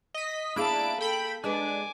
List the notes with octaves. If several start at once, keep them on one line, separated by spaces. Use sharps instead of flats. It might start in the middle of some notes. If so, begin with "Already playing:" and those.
D#5 B6
A#3 D4 E4 G#4 F5 A5 B5 D7
A4 G5 B5
G#3 D4 G#4 B4 G#5 D6